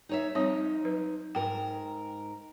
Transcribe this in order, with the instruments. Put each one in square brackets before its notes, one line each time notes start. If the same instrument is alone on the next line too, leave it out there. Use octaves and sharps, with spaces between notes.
[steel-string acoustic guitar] D#4 C#5 E5
[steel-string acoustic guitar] F3 D#4 [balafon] G3 C4 C#5
[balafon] F#3 B4
[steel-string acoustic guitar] G#2 A#4 A#5 [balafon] G5